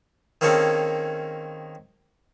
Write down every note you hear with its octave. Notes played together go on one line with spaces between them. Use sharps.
D#3 A#3 C4 C#4 G#4 A4